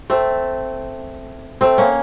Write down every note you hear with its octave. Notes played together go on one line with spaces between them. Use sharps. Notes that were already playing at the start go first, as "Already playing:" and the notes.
A3 C4
A3 C4
A#3 C#4